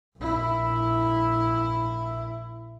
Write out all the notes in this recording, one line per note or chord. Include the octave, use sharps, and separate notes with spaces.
A#1 E4